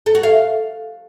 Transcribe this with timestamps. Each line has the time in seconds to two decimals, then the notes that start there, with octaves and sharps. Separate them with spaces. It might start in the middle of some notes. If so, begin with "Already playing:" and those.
0.06 A4
0.15 F#4
0.23 F5